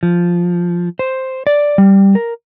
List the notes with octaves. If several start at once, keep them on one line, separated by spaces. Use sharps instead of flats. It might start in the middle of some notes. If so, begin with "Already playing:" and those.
F3
C5
D5
G3
A#4